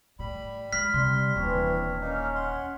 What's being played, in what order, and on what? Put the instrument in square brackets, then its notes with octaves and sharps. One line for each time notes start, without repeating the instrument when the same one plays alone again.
[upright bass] A2 [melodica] G3 B5
[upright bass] G#3 [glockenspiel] F6 B6
[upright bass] C3 [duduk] G3 [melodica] C6
[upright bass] D#1 [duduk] E3 [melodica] C4 D4 C#5
[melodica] A#3 D#4 [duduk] C#4
[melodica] F#5 C6